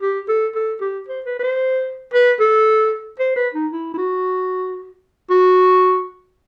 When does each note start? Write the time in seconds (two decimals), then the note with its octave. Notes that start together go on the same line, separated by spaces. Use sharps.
0.02 G4
0.29 A4
0.55 A4
0.81 G4
1.08 C5
1.26 B4
1.39 B4
1.43 C5
2.14 B4
2.40 A4
3.19 C5
3.36 B4
3.54 D#4
3.71 E4
3.94 E4
3.98 F#4
5.30 F#4